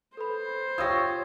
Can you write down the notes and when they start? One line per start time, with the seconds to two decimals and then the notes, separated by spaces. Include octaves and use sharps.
0.17 A4 B4 C5 B5
0.78 F4 G4 C#5 D#6 E6 G#6 A#6